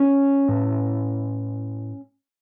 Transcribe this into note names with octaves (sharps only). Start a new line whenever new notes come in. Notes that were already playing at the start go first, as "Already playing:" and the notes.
Already playing: C#4
A2